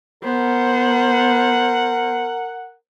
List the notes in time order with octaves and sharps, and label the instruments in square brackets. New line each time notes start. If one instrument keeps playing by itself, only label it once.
[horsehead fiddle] B3 C5 [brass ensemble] A#4 F#5